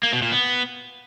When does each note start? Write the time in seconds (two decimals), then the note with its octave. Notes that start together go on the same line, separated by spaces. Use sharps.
0.03 A#3
0.13 B2
0.22 A#2
0.32 B3